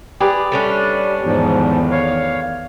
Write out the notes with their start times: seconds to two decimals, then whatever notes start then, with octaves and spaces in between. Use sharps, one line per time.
0.21 G4 G#4 B4 D5
0.52 G3 A3 C#4 D4
1.25 E2 G#2 D#3 F3
1.91 C#5 F5